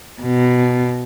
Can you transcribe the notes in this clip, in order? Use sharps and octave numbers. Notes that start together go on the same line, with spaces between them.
B2